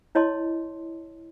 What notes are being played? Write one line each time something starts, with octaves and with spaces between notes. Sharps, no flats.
E4 C#5 D#5 A5 C6